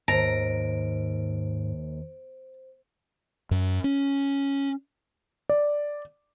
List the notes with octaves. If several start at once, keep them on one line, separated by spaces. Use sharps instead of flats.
D#2 G#2 C5 A#5 D7
F#2
C#4
D5